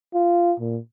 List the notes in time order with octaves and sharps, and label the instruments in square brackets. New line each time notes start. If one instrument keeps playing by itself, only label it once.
[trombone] F4
A#2